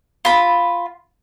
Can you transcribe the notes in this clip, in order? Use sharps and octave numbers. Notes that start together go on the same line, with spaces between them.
F4 B5